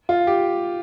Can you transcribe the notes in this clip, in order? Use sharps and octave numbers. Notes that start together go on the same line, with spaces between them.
F4
G4